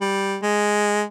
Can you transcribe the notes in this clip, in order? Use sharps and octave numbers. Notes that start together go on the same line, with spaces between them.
G3
G#3